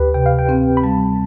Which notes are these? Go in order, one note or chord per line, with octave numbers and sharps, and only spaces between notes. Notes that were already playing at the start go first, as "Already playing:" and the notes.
Already playing: D2 G4 B4
C3 G5
F5
G5
C4
B5
G3 A5